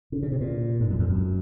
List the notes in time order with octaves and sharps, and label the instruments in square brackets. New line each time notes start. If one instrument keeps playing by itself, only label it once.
[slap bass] C#3
C#3
C3
A#2
G#2
F#2
F2
F#2